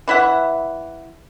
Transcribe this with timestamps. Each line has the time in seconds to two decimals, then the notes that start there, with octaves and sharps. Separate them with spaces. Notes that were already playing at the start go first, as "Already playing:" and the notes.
0.08 E3 E4 E5 F#5